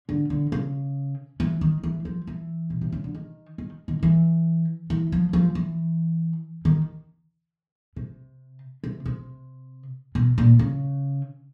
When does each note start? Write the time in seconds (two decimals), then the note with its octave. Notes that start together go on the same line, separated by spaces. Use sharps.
0.09 D3
0.30 D3
0.52 C#3
1.40 E3
1.61 D#3
1.83 E3
2.05 F3
2.27 E3
2.70 B2
2.81 C3
2.92 C#3
3.04 D3
3.15 D#3
3.58 D#3
3.88 D#3
4.03 E3
4.90 E3
5.12 F3
5.33 F3
5.55 E3
6.65 D#3
7.96 C3
8.84 C3
9.05 C3
10.15 B2
10.38 A#2
10.59 C#3